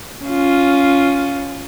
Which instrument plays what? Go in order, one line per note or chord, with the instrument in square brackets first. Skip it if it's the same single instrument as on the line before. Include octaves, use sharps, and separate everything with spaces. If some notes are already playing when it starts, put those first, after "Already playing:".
[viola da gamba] C#4 F4